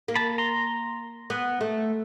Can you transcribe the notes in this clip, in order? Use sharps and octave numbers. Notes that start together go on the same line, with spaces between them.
A#3
A5 B5
A#5 C6
B3
A3